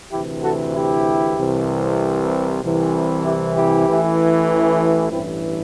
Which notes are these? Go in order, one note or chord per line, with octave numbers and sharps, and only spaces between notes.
D2 C3 E3 E4 G4
F#4 A4
E4 G4
C2 C3 E3
C2 C3 E3
E4 G4
E4 G4
A1 A2 E3
A1 G2 E3 C4 E4